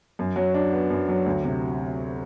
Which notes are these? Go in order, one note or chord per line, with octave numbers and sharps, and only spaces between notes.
F#2
F#3
D4
B3
F#2
F#3
D2
C3